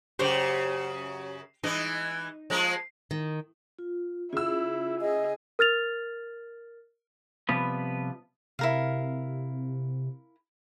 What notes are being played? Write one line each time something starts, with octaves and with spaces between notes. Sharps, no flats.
F#2 C#3 G4 C5 C#5
E3 G#3 D#4
F3 G#3 A#3
D#3
F4
C#3 E4 F4 E6
G#4 D#5
A#4 F6 A6 F7
C3 F3 G3 B3 B4
C3 E4 A#4 F5